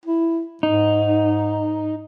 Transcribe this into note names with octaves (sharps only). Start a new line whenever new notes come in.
E4
G#2 D#4